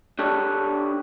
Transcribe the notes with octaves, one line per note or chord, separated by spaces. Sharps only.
D4 G4 A4 C#5